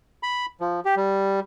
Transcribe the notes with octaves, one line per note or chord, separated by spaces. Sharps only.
B5
F3
G4
G3